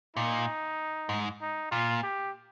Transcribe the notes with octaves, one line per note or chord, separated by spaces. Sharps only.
A#2 D#4
G#2
D#4
A#2 F4
G4